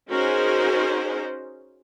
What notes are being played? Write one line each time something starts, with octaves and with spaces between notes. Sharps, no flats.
C#4 D#4 F#4 G#4 A#4 C5